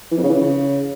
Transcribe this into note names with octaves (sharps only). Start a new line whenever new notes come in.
E3
F2
C#3
E3
C#3